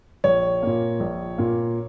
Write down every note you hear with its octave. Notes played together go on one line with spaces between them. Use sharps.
A#1 C#5
A#2 A#3
A#1
A#2 A#3